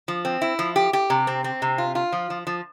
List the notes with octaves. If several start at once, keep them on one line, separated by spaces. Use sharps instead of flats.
F3
C4
E4
F3
G4
G4
C3
C4
C4
C3
F4
F4
F3
F3
F3